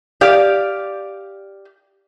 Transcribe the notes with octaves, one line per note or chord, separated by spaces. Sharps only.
G4 D5 F5